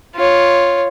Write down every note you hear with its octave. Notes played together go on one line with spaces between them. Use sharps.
F4 C#5